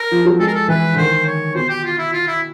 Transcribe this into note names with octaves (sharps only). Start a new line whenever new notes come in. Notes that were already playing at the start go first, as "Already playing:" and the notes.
Already playing: A#4
F3
F#3
G#3 A4
A#4
A4
E3 B4
D3
D#3 C5
C#5
B2 C5
G4
F4
E4
F4
E4